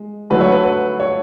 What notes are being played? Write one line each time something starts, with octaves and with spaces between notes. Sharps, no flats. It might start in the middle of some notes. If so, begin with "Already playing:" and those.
Already playing: G#3
D3 F#3 A3 B4
C#5
B4
B4
C#5